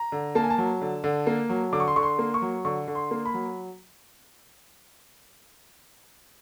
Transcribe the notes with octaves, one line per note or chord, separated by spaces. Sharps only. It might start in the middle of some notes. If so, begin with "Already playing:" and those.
Already playing: A#5
D3
A#3 A5
G#5
A5
F#3
D3
D3
A#3
F#3
D3 D6
C#6
C6
D3 C#6
C6
A#3
C#6
F#3
D3 C#6
D3
C6
A#3
B5
F#3